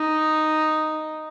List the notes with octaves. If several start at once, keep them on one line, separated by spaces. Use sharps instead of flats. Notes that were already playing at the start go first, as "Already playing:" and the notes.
Already playing: D#4